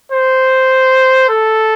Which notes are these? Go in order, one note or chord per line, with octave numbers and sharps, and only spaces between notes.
C5
A4